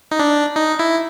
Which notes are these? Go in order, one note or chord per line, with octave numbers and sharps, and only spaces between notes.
D#4
D4
D#4
E4